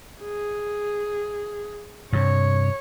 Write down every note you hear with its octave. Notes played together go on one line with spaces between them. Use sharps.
G#4
G2 C3 C#5